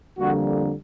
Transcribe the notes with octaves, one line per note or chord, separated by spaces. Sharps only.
F2 D3 G3 A#3 F#4